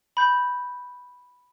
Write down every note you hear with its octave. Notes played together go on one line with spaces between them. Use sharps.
B5 G6